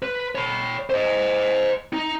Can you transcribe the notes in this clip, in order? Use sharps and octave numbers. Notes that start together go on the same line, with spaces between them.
B4
C#5 B5
C5 D#5
D#4